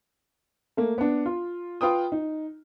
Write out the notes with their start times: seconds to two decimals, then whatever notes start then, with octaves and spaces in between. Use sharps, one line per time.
0.77 A3 A#3
0.98 B3 D4
1.26 F4
1.81 F4 B4 G5 D#6
2.12 D#4